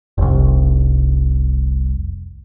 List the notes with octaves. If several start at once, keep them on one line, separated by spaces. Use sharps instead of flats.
F1 C2